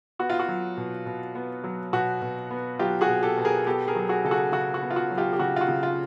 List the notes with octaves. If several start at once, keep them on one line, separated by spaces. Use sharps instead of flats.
B3 F#4
F4
F#4
F#3
B2
B2
B3
F#3
B2 F#4
B2
B3
F#3 F4 G4
F#4 G#4
B2
G4 A4
B2
G#4 A#4
B3 G4 A4
G#4 A#4
F#3
F#4 G#4
C#3 A4
F#4 G#4
C#3 F#4
F#4
B3
F4
F#4
F#3
F4 G4
G4
C#3 F#4
F4
F#4
C#3
F4